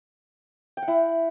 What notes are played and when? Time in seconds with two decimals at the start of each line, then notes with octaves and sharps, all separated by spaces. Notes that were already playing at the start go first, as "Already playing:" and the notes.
0.77 G5
0.82 F#5
0.88 E4